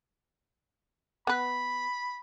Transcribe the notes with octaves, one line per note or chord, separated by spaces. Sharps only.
B3 B4 B5